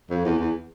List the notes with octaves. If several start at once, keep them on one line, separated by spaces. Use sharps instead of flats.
F2
E2
E2